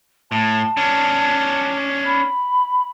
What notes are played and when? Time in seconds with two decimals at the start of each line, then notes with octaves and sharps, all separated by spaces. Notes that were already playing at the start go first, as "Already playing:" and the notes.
0.32 A2 A5
0.77 C#4 D4
2.06 B5